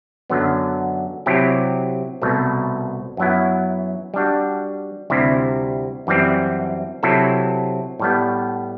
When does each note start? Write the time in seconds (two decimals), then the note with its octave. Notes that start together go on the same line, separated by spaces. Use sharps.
0.30 F#2 D3 F#3 B3
1.26 C3 F#3 C4 E4 G4
2.22 C2 B2 A3
3.17 F#2 F#3 B3 E4
4.14 G3 D4 F#4
5.10 D2 C3 G3 C4 E4
6.07 F#2 E3 G3 C4
7.03 C3 F#3 C4 E4 A4
7.99 A2 G3 B3